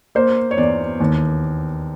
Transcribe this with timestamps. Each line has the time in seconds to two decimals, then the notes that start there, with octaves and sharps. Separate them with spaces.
0.15 A#3 C5
0.51 C#5
0.57 E2 D5
1.00 D#2